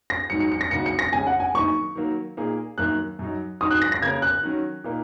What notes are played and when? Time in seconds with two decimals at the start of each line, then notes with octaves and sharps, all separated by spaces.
0.10 A#6
0.30 G#2 D#3 F#3 D#4 C#7
0.40 C#7
0.52 C#7
0.61 A#6
0.71 F#2 C#3 A#3 D#4 F#4 C#7
0.86 C#7
0.99 A#6
1.13 C#3 G#3 C#4 G#4 G#5
1.27 F#5
1.40 G#5
1.54 F#2 D#3 A#3 D#4 C#6
1.95 D#3 F#3 A#3
2.37 A#2 A#3 D#4 G#4
2.78 F#2 D#3 A#3 F#6
3.19 F#2 F#3 D#4
3.61 D#3 F#3 D#4 D#6
3.71 F#6
3.82 A#6
3.92 A#6
4.02 C#3 A#3 C#4 A#4 G#6
4.22 F#6
4.43 D#3 F#3 C#4
4.84 A#2 A#3 D#4